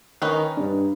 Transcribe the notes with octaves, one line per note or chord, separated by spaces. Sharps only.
D#3 C#4 D#4 B4
G2 D4